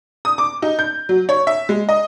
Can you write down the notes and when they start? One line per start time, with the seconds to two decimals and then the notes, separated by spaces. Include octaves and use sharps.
0.25 D#6
0.38 D6
0.62 D#4
0.79 G6
1.09 F#3
1.29 C#5
1.47 E5
1.69 G#3
1.89 D#5